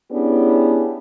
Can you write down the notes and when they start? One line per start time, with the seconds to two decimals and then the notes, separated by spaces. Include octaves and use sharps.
0.11 B3 C#4 D4 E4 G4 G#4